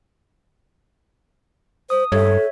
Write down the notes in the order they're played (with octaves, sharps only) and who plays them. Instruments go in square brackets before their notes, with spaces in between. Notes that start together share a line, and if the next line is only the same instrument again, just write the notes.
[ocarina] C5 [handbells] D#6
[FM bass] G2 [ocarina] A4 [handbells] C#5 E5